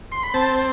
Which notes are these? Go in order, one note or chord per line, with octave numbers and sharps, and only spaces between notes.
C6
B5
C4 A5